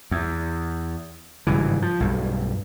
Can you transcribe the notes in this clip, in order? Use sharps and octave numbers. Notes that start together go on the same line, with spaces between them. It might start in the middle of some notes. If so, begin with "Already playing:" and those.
E2
G#1 G2 C#3 E3
F3
B1 G2